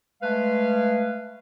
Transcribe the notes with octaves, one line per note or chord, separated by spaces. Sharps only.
G#3 A3 B4 F5